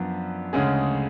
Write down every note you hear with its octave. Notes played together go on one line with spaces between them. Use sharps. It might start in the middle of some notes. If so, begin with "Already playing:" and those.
Already playing: F#2 F3 B3 D4
D2 C#3 G#3 C#4 G#4